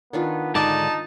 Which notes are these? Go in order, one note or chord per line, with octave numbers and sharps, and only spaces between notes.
D#3 B3 D4 F4
G#2 D3 D#4 D5 G#5 A5